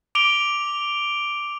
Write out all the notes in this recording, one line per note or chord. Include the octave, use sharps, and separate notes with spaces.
D6 D7 F7 G7